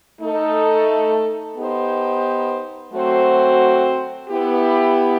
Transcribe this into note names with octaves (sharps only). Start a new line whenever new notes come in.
A3 D#4 A4
B3 D#4 G4 C5
F#3 A3 C4 F#4 C5
B3 E4 G4